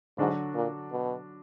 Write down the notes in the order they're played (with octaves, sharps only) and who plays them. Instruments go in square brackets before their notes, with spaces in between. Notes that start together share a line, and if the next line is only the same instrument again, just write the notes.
[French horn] G#2 [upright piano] D3 F#3 D4 F#4
[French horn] A#2
B2